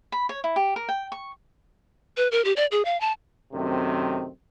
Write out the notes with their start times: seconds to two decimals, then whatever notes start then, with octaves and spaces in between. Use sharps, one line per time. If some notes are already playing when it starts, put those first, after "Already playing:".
0.12 B5
0.29 C#5
0.44 E4
0.56 G4
0.76 A#4
0.89 G5
1.12 C#6
2.17 B4
2.32 A#4
2.45 G4
2.56 D5
2.71 G#4
2.85 F5
3.01 A5
3.53 F#2 C3 D#3 A3 C4